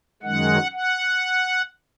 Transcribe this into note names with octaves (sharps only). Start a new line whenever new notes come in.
F#2 D#3 G#3 F#5
F#5